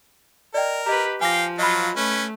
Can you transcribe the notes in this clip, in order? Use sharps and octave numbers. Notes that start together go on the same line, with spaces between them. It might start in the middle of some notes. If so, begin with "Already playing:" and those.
A#4 D5 D#5 G5
G4 B4 D#5 A#5
F3 F5 G5 G#5 D6 A#6
F#3 F4 D#5 B5
A3 C#4 B4